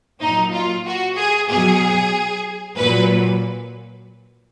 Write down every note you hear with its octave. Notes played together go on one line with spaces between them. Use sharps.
A#2 F#3 D#4
F4
F#4
G#4
B2 F#3 G#4
A#2 F#3 B4